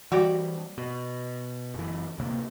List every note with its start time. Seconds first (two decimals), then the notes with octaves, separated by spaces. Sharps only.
0.12 E3 G3 F#4 G4 D5
0.78 B2
1.75 F#1 E3
2.18 D1 C3 A#3